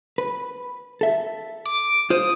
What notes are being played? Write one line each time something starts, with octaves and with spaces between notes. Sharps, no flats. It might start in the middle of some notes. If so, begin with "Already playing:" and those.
B4
A4 E5
D6
F4 C5 D#6